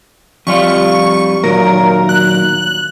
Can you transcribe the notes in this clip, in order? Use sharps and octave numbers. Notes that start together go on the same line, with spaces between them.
F2 G3 F4 C#6
A#2 D#3 F#3 A#4
F#6